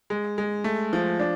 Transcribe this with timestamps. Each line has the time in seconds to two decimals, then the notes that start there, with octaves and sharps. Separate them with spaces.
0.10 G#3
0.38 G#3
0.64 A3
0.93 F3
1.20 D4